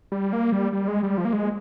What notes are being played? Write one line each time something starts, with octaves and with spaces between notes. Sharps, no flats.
G3
A#3
G3
G3
G#3
G3
F3
A#3
G#3